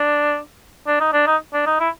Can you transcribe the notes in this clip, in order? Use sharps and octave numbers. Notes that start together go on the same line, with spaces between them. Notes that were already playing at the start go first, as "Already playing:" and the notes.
Already playing: D4
D4
D#4
D4
D#4
D4
D#4
E4